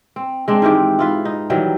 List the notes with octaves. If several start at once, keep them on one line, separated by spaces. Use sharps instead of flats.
C4
G#3 C4 D4
G#2 D#3 E3 G4
E4 F4 B4
D#4
D#3 E3 F#3 G3